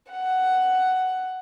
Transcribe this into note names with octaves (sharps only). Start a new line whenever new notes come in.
F#5